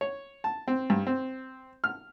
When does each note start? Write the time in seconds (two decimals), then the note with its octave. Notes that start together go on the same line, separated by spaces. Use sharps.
0.01 C#5
0.44 A5
0.68 C4
0.90 G2
1.07 C4
1.84 F6